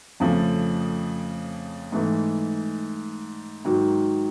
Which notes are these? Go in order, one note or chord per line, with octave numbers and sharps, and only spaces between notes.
F2 C#3 F3 A3
G#2 E3 A3
G#2 D#3 F#3